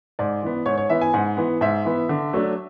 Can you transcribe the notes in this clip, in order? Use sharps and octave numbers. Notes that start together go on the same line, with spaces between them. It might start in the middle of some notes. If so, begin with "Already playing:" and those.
G#2 D5
E3 B3
G#2 C#5
C#5
E3 B3 E5
G#5
G#2 F#5
E3 B3
G#2 E5
E3 B3
D3
F#3 A3 D4